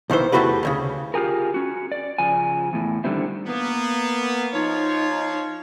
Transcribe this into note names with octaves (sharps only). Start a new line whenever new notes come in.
B1 D#3 E3 C5
E2 E3 A3 F#4 G4 B4
D2 A#2 C#3
F4 G4 G#4 A#4
C#4 F#4
D5
C#3 F3 G#5
E2 A2
G2 D3 D#3 G3 C4 E4
A#3 B3
F3 D#4 C#5